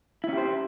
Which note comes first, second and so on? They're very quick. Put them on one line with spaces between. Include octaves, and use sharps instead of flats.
E4 C#4 G4 C5